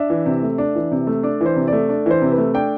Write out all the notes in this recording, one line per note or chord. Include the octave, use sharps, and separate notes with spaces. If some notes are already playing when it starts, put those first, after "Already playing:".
Already playing: D4 E5
E3
C3
A3
D4
E3
C3
A3
D4 D5
E3
C5
C3
A3 D5
D4 D5
E3 C5
C3
B4
A3
D4 G5